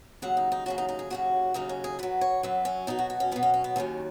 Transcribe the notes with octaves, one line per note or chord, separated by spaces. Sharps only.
D#2 C#3 F#3 F#5
D#4
D#4
D#2 C#3 F#3 F#4
D#4
D#4
G#4
D#2 C#3 F#3 F#4
D#2 C#3 F#3 D#4
C#4
G#4
F#2 F#3 B4
C#5
F#2 F#3 B4
C#4
B2 F#3 D#4
F#4
F#4
C#4
B2 F#3 B3
C#4
C#4
B3
D#2 D#3 F#3 C#4